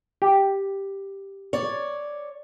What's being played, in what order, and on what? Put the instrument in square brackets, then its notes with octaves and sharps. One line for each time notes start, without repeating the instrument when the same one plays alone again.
[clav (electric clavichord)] G4
[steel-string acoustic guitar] C#5 D5